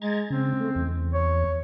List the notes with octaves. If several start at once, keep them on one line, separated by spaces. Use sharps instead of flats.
G#3 A#5 G#6 A6
C#3 C4
A3
E2
C#5